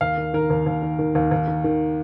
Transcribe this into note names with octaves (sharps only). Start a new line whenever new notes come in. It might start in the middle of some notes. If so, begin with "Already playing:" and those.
D#2 F5
D#3
D#3 A#4
D#2
D#2
D#3
D#3
D#2
D#2
D#3
D#3